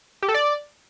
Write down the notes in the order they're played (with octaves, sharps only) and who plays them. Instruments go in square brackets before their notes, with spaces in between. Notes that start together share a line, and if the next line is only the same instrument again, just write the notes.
[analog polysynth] G4
A4
D5